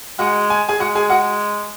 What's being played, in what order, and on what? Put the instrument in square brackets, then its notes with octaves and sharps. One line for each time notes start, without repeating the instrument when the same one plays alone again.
[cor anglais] G#3 [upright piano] F#4 F#5
[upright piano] G#5
G#4 G#5
[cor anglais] G#3 [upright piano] F#4 F#5
[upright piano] G#4 G#5
F#4 F#5